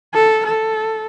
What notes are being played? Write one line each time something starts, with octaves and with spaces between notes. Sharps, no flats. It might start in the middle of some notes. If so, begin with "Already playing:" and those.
A4
A4